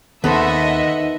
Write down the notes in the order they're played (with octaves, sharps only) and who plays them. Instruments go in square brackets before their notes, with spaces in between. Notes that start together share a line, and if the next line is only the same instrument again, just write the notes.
[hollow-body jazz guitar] D#2 [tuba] D#3 [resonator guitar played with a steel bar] B3 A4 C5 [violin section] D#5 E5 F#5